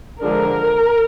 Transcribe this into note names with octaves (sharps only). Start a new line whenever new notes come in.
D3 F3 G#3 D4 A#4